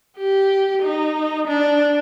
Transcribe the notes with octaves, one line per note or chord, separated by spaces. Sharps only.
G4
D#4
D4